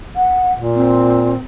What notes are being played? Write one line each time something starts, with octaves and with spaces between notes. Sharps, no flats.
F#5
A#2
C4